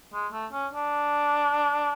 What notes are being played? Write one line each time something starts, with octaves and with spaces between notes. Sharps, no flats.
G#3
A3
C#4
D4